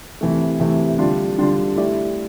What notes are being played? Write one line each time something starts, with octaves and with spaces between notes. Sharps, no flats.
C3 E3 A3
C3 E3 A3
D3 G3 D4 F4
D3 G3 D4 F4
A3 E4 G4 D5